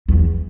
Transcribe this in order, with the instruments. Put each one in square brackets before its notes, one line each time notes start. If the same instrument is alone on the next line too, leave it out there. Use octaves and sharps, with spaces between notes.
[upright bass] E2